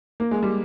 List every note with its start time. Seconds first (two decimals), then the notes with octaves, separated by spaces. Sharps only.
0.20 A#3
0.31 G#3
0.43 G3